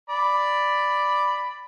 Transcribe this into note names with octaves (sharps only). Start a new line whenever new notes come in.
D5 B5